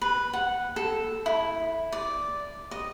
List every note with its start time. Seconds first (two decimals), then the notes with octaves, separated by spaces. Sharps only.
0.01 B4
0.33 F#5
0.76 A4
1.26 E4
1.92 D5
2.71 D#5